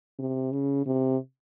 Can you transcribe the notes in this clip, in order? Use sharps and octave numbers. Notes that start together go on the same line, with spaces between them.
C3
C#3
C3